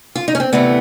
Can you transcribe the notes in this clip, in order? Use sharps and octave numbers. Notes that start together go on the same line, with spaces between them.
F4
D#4
C#4
C4
D2 C3 E3 A3 B3